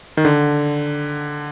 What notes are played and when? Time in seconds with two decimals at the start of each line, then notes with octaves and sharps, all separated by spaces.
0.17 D#3
0.25 D3